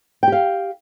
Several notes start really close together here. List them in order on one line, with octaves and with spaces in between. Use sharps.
G5 G4 F5